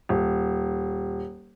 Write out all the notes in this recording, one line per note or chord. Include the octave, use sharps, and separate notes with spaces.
D#1